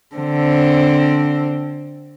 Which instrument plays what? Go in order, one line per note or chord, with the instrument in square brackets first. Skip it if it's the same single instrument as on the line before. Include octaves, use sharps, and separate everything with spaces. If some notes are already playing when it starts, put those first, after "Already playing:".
[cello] D3 C4